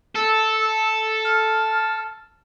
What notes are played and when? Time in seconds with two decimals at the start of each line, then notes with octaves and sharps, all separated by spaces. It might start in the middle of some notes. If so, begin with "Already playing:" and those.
0.16 A4 E6
1.25 F6